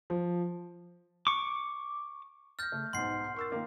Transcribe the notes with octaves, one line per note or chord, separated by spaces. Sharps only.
F3
C#6 D6
F6 G6 A6 A#6
C#3 A3
B1 G#2 F#5 C6 C7
A#4 C#6 E6 A6
D#3 A#3 F4